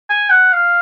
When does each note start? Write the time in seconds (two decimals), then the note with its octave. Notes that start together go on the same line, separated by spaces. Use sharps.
0.10 G#5
0.30 F#5
0.53 F5